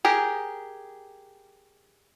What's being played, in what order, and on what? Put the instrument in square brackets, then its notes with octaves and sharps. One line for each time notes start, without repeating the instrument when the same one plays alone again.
[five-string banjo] G4 G#4 A#4